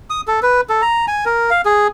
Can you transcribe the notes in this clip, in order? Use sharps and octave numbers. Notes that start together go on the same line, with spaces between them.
D#6
A4
B4
A4
A#5
G#5
A#4
F5
G#4